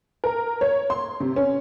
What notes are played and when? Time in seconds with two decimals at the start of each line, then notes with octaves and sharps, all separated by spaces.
0.24 A#4
0.61 C#5
0.90 C6
1.20 C3
1.36 C#4